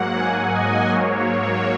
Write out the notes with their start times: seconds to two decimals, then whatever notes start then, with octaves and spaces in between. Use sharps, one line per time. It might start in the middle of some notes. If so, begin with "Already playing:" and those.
Already playing: G#2 F#3 A#3 F#5
0.15 G#5
0.53 D#5
0.90 G#2 F#3 A#3 C#5